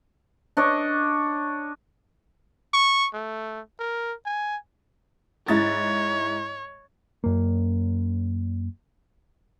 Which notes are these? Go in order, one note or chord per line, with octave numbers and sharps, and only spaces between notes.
D4 C#5 D#5
C#6
A3
A#4
G#5
G#2 E4 C#5 A6
F#2 A#3